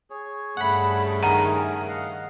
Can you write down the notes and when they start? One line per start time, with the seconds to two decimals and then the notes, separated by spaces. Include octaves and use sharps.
0.10 G#4 C#5
0.57 G2 C#3 A3 F#5 B5
1.22 D#3 G#4 A#4 F#5 A#5 D#7
1.89 D#5 F5 F#5